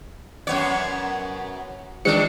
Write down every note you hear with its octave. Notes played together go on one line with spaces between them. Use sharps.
F#2 B3 C#5
D#3 F3 G#3 D4 C#7